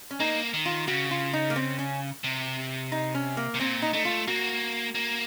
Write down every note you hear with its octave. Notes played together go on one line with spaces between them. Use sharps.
C#4
A#3 D#4
D#3
F4
C#3 F#4
F4
D#4
A#3
C4
C#4
C3
D#4
C#4
A#3
C3
A#2 C4
D#4
A3 D#4
F4
A#3 F#4
A#3